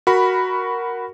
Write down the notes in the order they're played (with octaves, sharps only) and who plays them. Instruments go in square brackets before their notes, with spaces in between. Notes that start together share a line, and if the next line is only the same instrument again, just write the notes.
[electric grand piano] F#4 A#4 B5